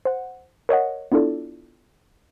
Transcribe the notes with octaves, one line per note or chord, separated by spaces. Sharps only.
C5 F#5
A#4 C#5 D#5 F#5
B3 D4 E4 F4 A4 D5